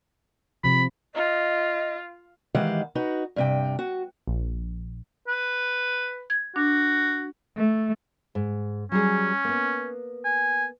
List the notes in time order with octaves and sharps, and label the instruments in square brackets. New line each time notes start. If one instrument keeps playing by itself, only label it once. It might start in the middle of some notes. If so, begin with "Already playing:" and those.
[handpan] C3 F3 [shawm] B5
[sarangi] F4 [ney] D#5
[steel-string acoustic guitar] D#3 E3 G#3 G4 F5 F#5
D#4 F#4 B4
G2 C3 G5
F#4
[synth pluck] A#1
[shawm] B4
[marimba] G#6
[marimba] D4 [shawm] F#4
[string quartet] A3
[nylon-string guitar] G#2
[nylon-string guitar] F#3 G3 G#4 [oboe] C#4
[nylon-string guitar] A#3 B3
[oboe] G#5